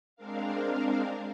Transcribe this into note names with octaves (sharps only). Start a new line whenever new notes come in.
G#3 C4 D4 A#4 F5